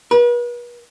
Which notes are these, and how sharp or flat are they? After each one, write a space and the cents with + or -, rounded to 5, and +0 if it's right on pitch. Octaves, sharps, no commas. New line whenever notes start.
B4 -40